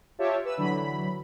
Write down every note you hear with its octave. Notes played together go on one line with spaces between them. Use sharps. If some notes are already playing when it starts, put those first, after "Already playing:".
F4 G4 C#5 E5 A5
B4 E6
D3 E3 F#3 B5